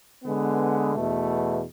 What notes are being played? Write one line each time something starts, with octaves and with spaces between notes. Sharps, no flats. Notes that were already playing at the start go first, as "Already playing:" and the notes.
D3 G#3 B3
E2 B2 A3